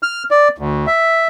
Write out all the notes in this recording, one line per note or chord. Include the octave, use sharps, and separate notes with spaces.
F6
D5
D2
E5